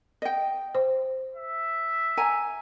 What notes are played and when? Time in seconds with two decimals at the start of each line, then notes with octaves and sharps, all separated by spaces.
0.22 D#5 G5
0.75 C5
1.36 E5
2.17 G#5 A#5